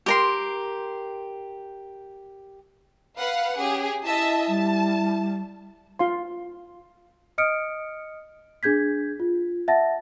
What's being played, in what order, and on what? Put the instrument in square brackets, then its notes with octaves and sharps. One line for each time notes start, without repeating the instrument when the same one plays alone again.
[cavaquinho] G4 A#4 C6
[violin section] B4 F5 F#5
[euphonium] C#4 [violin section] G4 G#4
[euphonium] E4 [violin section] D#5 E5 A5
[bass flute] G3 [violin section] A5
[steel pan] F4 F5 C6
[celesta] D#5 D#6 F6 C#7 D7
D4 G#4 G6 G#6 B6
F4
E5 F#5 A5 A6 A#6